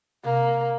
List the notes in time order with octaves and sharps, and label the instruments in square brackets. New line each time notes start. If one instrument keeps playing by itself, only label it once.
[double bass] C3 [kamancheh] A#3